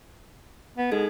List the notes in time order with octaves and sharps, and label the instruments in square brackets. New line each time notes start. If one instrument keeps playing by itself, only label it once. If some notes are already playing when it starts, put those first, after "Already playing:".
[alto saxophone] B3
[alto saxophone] G#3 [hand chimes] D#4 A4 G#6